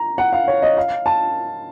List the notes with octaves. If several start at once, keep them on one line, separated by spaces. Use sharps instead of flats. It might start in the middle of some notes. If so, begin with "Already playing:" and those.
Already playing: A#5
F#5
F5
C#5
D#5
F5
A5